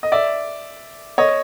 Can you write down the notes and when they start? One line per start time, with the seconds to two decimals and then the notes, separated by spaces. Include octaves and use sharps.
0.03 D#5
0.12 D5 E5
1.18 C#5 D#5